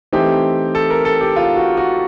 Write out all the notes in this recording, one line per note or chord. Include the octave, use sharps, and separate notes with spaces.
E3 A3 C4 D#4 G4
A4
A#4
A4
G4
F4
F#4
F#4